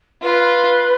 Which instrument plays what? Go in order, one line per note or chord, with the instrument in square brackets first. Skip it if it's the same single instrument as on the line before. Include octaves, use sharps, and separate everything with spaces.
[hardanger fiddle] F4 [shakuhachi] B4